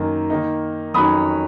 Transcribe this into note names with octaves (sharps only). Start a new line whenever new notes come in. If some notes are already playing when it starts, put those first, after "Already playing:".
Already playing: F#2 D#3 A#3 D#4
D#3 A#3 D#4
F2 D#3 F#3 C#4 B5 D#6